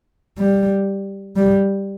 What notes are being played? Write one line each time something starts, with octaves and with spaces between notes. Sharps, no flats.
G3
G3